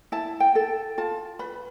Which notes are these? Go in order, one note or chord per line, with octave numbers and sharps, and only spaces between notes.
E4 A5
G5
A4
F4 A5
B4 B5